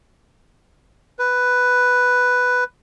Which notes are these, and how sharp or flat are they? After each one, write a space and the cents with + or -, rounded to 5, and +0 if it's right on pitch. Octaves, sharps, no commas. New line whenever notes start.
B4 +5